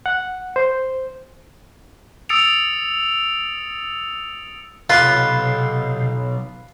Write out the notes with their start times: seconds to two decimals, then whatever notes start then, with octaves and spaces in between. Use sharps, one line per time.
0.06 F#5
0.56 C5
2.29 D#6 E6 A6 C#7 D7 F7
4.90 B1 C3 F4 B4